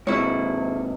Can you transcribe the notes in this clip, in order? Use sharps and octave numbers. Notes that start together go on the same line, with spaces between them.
G#2 C3 E4 C#5